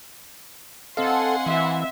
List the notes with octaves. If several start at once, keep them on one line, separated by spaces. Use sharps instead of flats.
C4 A4 D#5 F5 F#5 G#5 C6
E3 E5